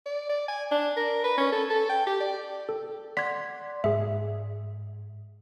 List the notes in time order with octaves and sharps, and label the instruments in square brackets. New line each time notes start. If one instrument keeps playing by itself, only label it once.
[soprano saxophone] D5
D5
G#5
D4
A#4
B4
C#4
A4
A4
G5
G4
D5
[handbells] A4
[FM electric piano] D5 F#5 C6 [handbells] G#6 B6
[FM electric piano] G#2 [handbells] G#4 E5